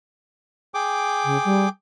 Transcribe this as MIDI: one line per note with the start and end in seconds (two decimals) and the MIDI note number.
0.74 1.69 68
0.74 1.69 79
0.74 1.69 86
1.25 1.38 49
1.45 1.66 55